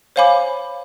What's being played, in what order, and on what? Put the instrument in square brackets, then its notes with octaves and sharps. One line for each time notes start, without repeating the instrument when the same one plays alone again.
[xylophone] C5 C#5 F5 G#5 B5 D6